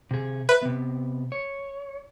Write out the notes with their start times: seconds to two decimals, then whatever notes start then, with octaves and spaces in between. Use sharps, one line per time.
0.11 C3 G#4
0.49 B4 E5
0.62 C3 B3
1.32 C#5